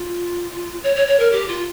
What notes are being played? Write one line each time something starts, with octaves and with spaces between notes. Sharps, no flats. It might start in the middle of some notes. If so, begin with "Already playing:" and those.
Already playing: F4
C#5
C#5
C#5
A#4
G4
F4